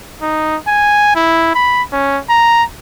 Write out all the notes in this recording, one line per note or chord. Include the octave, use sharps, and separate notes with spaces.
D#4
G#5
E4
B5
C#4
A#5